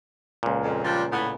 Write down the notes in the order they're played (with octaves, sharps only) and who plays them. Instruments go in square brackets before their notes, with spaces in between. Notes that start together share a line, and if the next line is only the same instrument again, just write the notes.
[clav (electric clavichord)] C#2 A#2
[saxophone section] F2
F3 G3 D4
A2 B3